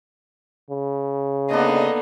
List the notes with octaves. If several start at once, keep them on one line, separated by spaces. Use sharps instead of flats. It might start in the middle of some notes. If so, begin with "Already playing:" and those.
C#3
D3 A#3 B3 D4 D#4 D#5